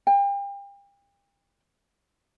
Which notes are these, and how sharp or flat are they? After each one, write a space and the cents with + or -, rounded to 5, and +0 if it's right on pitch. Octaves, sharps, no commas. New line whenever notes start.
G5 +35